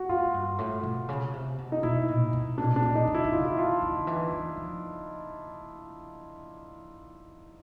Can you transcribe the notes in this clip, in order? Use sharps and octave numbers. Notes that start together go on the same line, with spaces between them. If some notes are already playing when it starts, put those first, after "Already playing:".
Already playing: F#4
G#2 F4
G2
A2
B2
C#3
C3
B2
D#4
B2 E4
A#2
B2
A#2 D4
D4
A#2
D#4
D3
E4
D3
C#3 F4
E4
F4
D3
E3
E3
F3